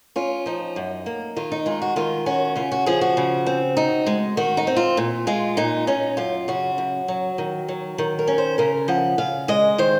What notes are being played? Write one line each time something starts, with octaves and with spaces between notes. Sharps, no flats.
C#4 F4
F3 D#4
F#2
A#3
D#3 F4
D#4
G#3 F4
F#4
D#3 F4
C#4 F#4
C#3 F4
F#4
F3 G#4
F#4
C#3
C4
D#4
G#3
D#3 F#4
D#4
C4
F4
A#2
G#3 F4
A#2 D#4
C#4 D#4
F#2 F4
C#3 F#4
F#2
F#3
D#3
F#3
D#3
A#4
C#4
C5
C#3 A#4
F3 F#5
C#3 F5
G#3 D#5
D#3 C5